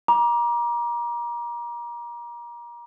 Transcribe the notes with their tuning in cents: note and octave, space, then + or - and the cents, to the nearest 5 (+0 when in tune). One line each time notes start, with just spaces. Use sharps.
A#5 +30 D6 +0